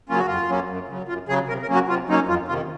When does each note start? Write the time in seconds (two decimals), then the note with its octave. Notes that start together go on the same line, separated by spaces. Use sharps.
0.09 C#3 F#3 A#3 C#4 F4
0.18 F#4
0.26 F2 F4
0.49 C#3 F#3 A#3 C#4
0.69 F#2
0.88 C#3 F#3
1.08 F#2 F4
1.28 C#3 F#3 G#4
1.48 C3 A#4
1.62 A#4
1.69 F#3 A#3 C#4
1.75 F#4
1.88 C3 F4
2.08 F#3 A#3 C#4 D#4
2.28 F2 F4
2.48 C3 D#3 F4